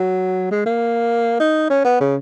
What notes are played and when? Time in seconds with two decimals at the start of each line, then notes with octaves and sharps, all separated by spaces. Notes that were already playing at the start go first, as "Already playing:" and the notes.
Already playing: F#3
0.51 G#3
0.66 A#3
1.40 D#4
1.70 C#4
1.85 B3
2.00 C#3